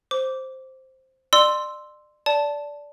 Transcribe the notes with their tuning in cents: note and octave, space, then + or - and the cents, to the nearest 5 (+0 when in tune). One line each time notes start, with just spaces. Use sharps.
C5 +0 D6 -15
D5 +35 C6 +0 E6 +0
D5 -15 A5 +0